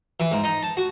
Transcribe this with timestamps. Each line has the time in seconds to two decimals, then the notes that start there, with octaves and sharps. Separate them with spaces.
0.20 E3
0.32 G#2
0.44 D#4
0.63 A5
0.77 F#4